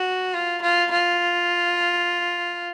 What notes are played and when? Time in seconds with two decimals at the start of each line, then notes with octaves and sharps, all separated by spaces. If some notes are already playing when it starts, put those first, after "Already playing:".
Already playing: F#4
0.34 F4
0.62 F4
0.91 F4